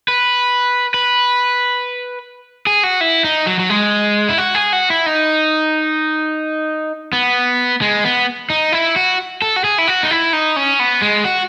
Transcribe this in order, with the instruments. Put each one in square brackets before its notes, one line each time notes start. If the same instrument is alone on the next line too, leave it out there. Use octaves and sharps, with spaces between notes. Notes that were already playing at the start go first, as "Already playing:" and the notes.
[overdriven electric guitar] B4
B4
G#4
F#4
E4
D#4
F#3
F#3
G#3
E4
F#4
G#4
F#4
E4
D#4
B3
G#3
B3
D#4
E4
F#4
A4
F#4
G#4
E4
F#4
D#4
E4
D#4
C#4
B3
G#3
F#4